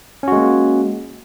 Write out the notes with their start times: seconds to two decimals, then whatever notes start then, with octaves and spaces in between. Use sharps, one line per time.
0.23 C#4
0.28 F#4
0.32 G#3
0.37 A#3